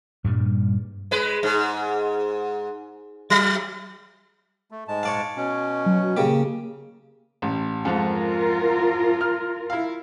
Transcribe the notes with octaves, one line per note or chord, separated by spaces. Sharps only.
G2 A#2 G3
G#3 B4
G#2
F#3
A3
G#2 G#3 A5
C#5 D5 F5
B2 C#4
F#3
C#3 A#3 G4
A1
F2 G#2 F4 A#4
F6
E4 F5